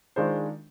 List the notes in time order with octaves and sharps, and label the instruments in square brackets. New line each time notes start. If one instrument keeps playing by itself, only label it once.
[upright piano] D#3 G#3 D4 F4 C5